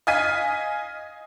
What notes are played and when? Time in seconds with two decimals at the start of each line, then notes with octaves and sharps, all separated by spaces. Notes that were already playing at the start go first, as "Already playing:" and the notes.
0.07 D#5 F5 G#5 G#6 B6 D#7